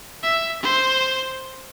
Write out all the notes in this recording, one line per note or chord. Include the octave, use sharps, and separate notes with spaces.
E5
C5